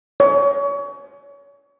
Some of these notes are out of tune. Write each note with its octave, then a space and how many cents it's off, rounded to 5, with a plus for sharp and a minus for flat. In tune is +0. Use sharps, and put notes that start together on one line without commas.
C#5 +30